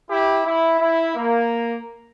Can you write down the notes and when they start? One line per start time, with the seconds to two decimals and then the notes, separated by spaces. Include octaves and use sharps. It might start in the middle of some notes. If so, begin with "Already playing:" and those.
0.08 E4 G4
0.44 E4
0.79 E4
1.15 A#3